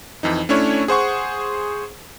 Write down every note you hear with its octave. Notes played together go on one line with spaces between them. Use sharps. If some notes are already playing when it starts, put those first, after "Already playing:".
F2 E3 D#4
A3 C#4 D4 E4 C#5
G#4 C5 F#5 C#6